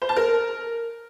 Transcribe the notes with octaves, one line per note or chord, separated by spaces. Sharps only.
C5
A5
A#4